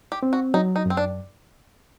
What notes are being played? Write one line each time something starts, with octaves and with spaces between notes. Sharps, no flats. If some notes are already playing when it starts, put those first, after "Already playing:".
G4
C4
F#4
F#3 D#4
D#4
F#2 C4
D4